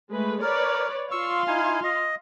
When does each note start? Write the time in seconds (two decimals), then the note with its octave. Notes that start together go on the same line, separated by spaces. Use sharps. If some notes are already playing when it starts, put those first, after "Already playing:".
0.11 G#3 A3 B4
0.42 A#4 B4 C#5 D5
1.11 F4 F5 C6 C#6 E6
1.47 D#4 E4 G#5
1.84 D#5